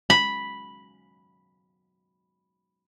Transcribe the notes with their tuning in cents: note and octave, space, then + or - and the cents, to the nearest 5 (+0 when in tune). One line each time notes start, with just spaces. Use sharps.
B5 -5